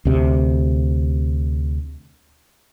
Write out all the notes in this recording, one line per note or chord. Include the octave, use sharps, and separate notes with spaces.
D2 C3